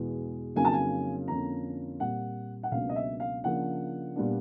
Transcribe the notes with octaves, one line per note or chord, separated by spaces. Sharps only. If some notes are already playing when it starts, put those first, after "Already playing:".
Already playing: E2 B2 G#3
F2 C#3 F#3 A#3 D#4 G#5
A5
G#5
F2 D3 F3 A#3 C#4 A#5
A#2 G3 C4 F#5
F#5
C#2 B2 F#3 A#3 D4 F5
D#5
E5
F5
C#3 F3 A#3 D4 F#5
A#2 G3 B3 D4